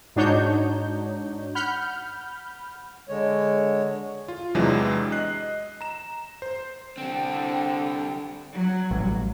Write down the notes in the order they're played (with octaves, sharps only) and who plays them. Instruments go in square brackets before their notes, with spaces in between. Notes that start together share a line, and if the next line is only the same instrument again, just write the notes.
[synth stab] G#2 D4 D#4 F#4 C#5 G6
F#5 B5 F6 G6
[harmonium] D3 G#3 C#5
[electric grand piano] F4
E2 C3 E3 F#3 G#3 D4
D#5 F#6 C7
A#5 E7
C5
[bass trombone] D3 [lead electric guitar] G3 C4 [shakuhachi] G5
[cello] F#3
[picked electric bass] A1 G3